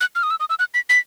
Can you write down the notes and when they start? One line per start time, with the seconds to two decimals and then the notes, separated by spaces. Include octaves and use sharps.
0.01 F#6
0.15 F6
0.23 D#6
0.31 E6
0.40 D#6
0.50 E6
0.59 F#6
0.74 B6
0.89 B6